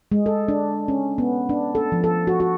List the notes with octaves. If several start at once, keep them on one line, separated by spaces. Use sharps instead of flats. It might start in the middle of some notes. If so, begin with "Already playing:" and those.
G#3
A4
D4
C#4
B3
D4
A4
F3
A4
F#4
F#4